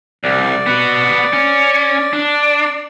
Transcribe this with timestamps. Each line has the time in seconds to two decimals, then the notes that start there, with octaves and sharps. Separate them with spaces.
0.24 C2 D5
0.66 B3 F#4
1.33 C#4
2.13 D4